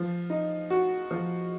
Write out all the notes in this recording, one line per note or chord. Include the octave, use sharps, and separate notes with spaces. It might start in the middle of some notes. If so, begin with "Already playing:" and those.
Already playing: F3
D#4
F#4
F3